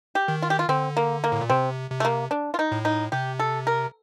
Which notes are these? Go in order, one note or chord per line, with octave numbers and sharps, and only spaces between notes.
G4
D#3
F4
G4
F4
D3 C4
A#3
A#3
A2
A#2
C3 C4
C3
A3
A#3
D4
F4
D#4
A2
D#4
C3 G4
A4
A#4